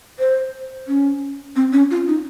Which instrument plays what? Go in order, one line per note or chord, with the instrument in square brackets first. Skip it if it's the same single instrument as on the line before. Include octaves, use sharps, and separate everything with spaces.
[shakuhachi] C5
C#4
C4
C#4
F4
D#4